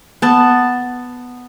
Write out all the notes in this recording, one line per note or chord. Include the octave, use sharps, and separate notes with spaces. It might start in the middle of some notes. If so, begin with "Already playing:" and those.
B3 A5